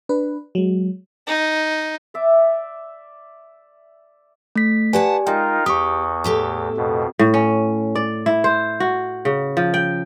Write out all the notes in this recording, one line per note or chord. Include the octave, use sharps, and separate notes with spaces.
D4 B4
F#3 G#3
D#4
D5 E5 D6
A3 B6
G4 B4 D5 F#5 G#5 A5
G#3 D#4 F4 A#4 G5
E2 G4 C#6 D#6
A2 G4 A4
F2 B2
A2
C#4
D5
E4
C5
F#4
C#3
F3
G5